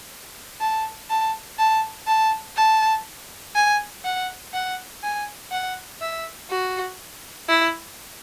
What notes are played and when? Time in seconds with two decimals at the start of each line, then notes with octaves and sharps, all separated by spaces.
0.60 A5
1.10 A5
1.59 A5
2.07 A5
2.57 A5
3.55 G#5
4.05 F#5
4.54 F#5
5.03 G#5
5.51 F#5
6.01 E5
6.50 F#4
7.49 E4